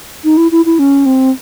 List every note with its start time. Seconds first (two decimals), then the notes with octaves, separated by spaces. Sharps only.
0.24 D#4
0.37 E4
0.52 E4
0.66 E4
0.79 C#4
1.06 C4